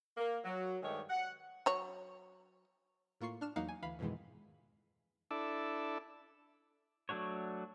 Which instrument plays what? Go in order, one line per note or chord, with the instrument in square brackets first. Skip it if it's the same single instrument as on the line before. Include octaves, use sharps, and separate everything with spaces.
[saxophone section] A#3
F#3
G2 D#3 G#3 A3 C#5
F#5
[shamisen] F#3 C#5
[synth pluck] A2 A#3 F4 C#6 C7
D4 F6 E7
E2 F#3 A#3 D#4 F5 F#5
G#5
D2 E3 F5 B5
F2 G#2 B2 D#3 E3 G#3
[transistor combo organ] D4 E4 A4
[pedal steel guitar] F#3 A3 D4 F#4 C#5